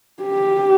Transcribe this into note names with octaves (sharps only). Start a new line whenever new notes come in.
G4